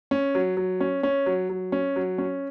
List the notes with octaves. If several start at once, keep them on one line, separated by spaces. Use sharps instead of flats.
C#4
F#3
F#3
C#4
C#4
F#3
F#3
C#4
F#3
C#4